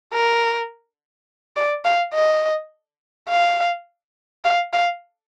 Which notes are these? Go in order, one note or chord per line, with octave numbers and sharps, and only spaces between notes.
A#4
D5
F5
D#5
F5
F5
F5